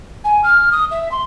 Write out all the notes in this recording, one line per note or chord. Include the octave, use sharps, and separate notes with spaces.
G#5
F6
D#6
E5
C6